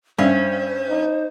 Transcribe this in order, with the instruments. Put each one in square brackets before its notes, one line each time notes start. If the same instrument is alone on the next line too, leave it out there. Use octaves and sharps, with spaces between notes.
[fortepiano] G2 E5 F5 [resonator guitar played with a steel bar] C#4 [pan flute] C5
[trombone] D#4